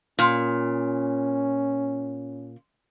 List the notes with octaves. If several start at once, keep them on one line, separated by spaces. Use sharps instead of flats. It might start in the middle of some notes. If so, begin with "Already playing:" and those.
A#2 C#4